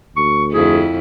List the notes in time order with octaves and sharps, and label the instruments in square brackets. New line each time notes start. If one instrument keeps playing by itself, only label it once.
[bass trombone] D2 [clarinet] C#6
[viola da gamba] F2 E4 [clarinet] G#4